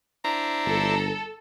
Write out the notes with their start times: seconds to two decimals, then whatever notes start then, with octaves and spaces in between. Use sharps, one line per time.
0.24 D4 E4 C5 A#5
0.66 G1 A4